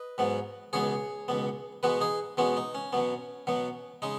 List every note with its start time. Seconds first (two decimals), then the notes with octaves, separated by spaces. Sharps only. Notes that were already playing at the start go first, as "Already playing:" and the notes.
Already playing: B4 D#5
0.18 G#2 F#3 B3
0.73 C#2 B2 B3 G#4 C#5
1.28 C#2 B2 B3
1.83 B2 G#3 B3 F#4 B4
2.01 D#4 G#4
2.37 B2 G#3 B3 C#4 F#4
2.57 D#4
2.75 C#4
2.93 B2 F#3 B3
3.47 B2 F#3 B3
4.02 C#3 G#3 D#4